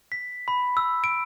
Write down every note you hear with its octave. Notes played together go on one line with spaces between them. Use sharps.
B6
B5
E6
D7